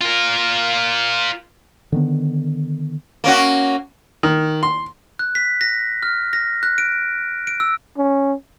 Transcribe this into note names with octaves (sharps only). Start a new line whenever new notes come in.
F4 A#4
D3 D#3 B3
A#3 C#4 F#4
D#3
C6
F#6
B6
A#6
F6
A#6
F#6
D7
D7
E6
C#4